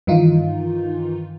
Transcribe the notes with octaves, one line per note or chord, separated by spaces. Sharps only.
G2 D#3 E3 D#4 F4